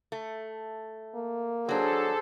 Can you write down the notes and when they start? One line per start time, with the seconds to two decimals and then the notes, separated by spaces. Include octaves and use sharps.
0.12 A3
1.15 A#3
1.69 F#3 D4 G#4 A4 C5